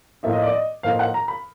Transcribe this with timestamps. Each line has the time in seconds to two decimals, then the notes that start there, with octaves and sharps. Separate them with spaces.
0.23 A2 F3 A#3 D#4 E5
0.33 D#5
0.42 D5
0.52 D#5
0.83 A2 F3 A#3 D#4 F5
0.99 F#5
1.14 A#5
1.28 B5